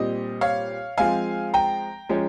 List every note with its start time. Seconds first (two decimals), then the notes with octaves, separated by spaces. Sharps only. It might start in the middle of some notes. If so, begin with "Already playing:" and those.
Already playing: A#2 G3 C4 D#5
0.41 C#5 F5
0.97 F3 G#3 C4 F5 G#5
1.54 G5 A#5
2.09 F3 G#3 C#4